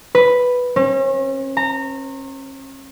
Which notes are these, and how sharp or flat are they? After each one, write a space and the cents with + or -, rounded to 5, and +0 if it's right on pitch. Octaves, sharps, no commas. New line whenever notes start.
B4 +0
C#4 -40
A#5 -25